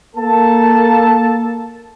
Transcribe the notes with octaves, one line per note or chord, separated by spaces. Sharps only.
A#3 A4 A5